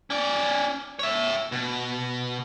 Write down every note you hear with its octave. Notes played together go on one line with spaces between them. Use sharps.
C#4 D5
C#5 E5
B2